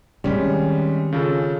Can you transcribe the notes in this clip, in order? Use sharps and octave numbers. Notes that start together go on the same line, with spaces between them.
D#3 G3 G#3 C4 C#4
C#3 F4 A4